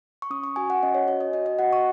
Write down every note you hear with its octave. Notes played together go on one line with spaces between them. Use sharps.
C#6
C#4 D#6
C#6
F#4 G#5
F#5
C#4 D#5
C#5
F#4 C#5
D#5
F#4 D#5
D#5
F#4 F#5
C#6